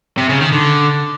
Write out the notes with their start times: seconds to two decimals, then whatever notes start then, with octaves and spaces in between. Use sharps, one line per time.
0.18 C3
0.29 C#3
0.41 D#3
0.52 D3